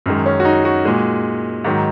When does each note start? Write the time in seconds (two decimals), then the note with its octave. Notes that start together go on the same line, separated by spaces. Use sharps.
0.06 F#2 D#3 G#3
0.26 C#4
0.40 F#4
0.45 D#4
0.65 F#4
0.85 A#2 G#3
1.65 G#2 D#3 F#3